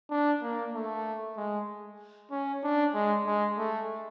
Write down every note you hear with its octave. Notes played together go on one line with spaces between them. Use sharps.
D4
A#3
A3
G#3
C#4
D4
G#3
G#3
A3